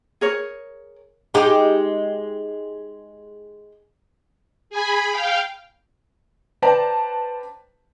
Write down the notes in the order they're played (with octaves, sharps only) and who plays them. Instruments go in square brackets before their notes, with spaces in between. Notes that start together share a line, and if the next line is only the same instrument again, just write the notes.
[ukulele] G#4 A#4 C#5
[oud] G#3 D#4 G4
[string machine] G#4 G#5 B5
F5 G5
[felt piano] B4 C5 D5 G5 A5 A#5